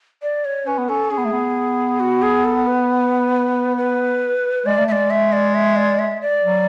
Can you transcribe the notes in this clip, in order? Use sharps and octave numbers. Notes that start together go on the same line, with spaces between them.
D5
C#5
C#4 B4
B3
C#4 A4
C#4 G#4
B3
A3
B3
F#4
G#4
A4
B4
B4
G#3 D5
A3
E5
G#3 D5
E5
D5
E5
D5
E5
D5
F#3